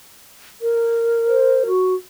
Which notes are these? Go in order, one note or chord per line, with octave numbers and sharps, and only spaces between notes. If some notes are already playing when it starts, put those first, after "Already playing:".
A#4
C5
F#4